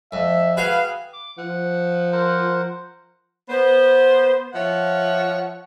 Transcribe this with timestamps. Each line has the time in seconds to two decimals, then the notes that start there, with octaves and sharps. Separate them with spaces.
0.12 F2 E5
0.57 F#4 G#4 B4 F5 G5 G#5
1.13 D6
1.37 F3 F#5
2.12 A#4 C5 F#5
3.49 B3 C5
4.53 F3 C#5 E5 F#5